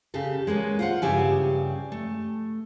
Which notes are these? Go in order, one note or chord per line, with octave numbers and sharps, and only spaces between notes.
C#3 G4 A4
G#3 A#3 B3 C#4
F4 C5 F#5
G2 C#3 G4 E5 G#5
A3